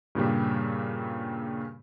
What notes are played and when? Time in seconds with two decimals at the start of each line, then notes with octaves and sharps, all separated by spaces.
0.15 G2 A#2 C#3 G3